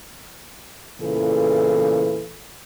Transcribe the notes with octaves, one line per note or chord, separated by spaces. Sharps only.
E2 A#2 C#3 E3 A4